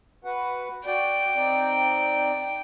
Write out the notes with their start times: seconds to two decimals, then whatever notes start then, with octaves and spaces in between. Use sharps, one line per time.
0.24 F#4 B4 F#5
0.86 F#4 D5 G5
1.36 C4 D#4 D5